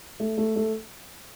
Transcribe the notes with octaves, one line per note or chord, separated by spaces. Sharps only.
A3
A3
A3